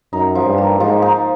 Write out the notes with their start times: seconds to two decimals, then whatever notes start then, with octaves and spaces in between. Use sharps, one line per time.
0.12 F#2 D#4
0.35 F3
0.46 G2
0.58 A#3
0.80 G#2 F3
1.02 D#4